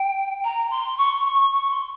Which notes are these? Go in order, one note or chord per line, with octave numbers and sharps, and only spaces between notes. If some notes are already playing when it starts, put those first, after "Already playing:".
Already playing: G5
A#5
C6
C#6
C#6
C#6
C6